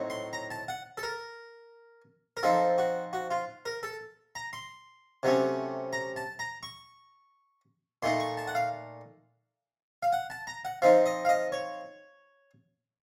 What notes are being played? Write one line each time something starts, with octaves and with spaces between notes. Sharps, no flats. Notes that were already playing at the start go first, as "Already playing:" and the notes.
Already playing: A2 F#3 C4 D#4
C6
A#5
A5
F#5
A4
A#4
A#4
F3 C4 D#4 A4
F#4
F#4
F4
A#4
A4
A#5
C6
C3 F#3 A3 C#4
A#5
A5
A#5
C#6
A#2 A3 D#4 C6
C#6
A5
F#5
F5
F5
F#5
A5
A#5
F#5
F3 C4 D#4 F5
D#5
F5
D#5
C#5